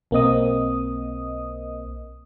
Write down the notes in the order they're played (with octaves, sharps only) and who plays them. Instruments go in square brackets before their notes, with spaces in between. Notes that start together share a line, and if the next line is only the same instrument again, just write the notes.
[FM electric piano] B1 A#3 C4 D#5 D#6